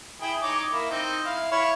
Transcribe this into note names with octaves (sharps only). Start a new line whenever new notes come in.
E4 G#4 G5
D#4 C#5 D6
A#3 E4
C4 D#4
E4 F5 B5
E4 C#5 B5